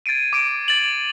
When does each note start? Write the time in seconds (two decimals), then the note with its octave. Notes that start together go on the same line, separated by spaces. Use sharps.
0.06 G#6 A6 C7 D7 D#7
0.33 D6 D7
0.68 A6 F#7